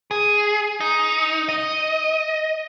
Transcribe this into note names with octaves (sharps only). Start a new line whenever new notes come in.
G#4
D#4
D#5